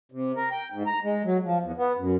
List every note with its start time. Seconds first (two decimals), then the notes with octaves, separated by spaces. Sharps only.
0.12 C3
0.36 A#4
0.51 G5
0.72 G#2
0.87 A#5
1.03 G#3
1.24 F#3
1.44 F3
1.63 E2
1.77 B3
1.98 F#2